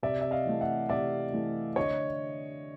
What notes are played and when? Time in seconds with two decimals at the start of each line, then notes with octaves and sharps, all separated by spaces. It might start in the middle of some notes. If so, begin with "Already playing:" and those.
0.03 C3 D5 E5
0.21 E5
0.31 D#5 F5
0.46 E3 A3
0.61 E5 F#5
0.89 C3 D5 E5
1.33 E3 A3
1.76 D3 C#5 D#5